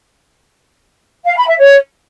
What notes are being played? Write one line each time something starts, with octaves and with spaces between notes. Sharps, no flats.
F5
B5
E5
C#5